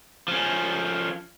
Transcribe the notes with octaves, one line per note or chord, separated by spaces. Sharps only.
F3 C#4